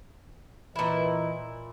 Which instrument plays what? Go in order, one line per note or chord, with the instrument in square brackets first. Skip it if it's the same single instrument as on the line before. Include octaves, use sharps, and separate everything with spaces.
[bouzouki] A#2 E4 [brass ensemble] E3 B4 D#5